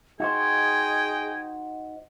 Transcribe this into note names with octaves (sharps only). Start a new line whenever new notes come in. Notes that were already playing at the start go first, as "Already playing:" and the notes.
D#4 F#4 G#4 C5 D#5 G5 G#6